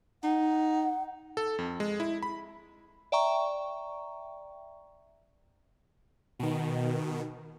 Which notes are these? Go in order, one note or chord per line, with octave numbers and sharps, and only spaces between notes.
D#4 F#5
A4
F2
G#3
E4
B5
D5 E5 G5 A#5 C#6
B2 D#3